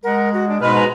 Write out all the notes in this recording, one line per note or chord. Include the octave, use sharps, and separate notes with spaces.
G#3 A#4 F#5
F#4
D4
G#2 B2 G#3 B4 F6
F#4 G#5 A#5